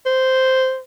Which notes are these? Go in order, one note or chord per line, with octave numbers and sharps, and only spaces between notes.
C5